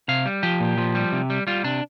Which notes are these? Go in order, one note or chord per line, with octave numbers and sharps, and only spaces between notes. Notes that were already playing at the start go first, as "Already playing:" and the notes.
C3 F5
G3
F3 G4
A#2
F3
G3
C3
G3
G3 F4
C3 D4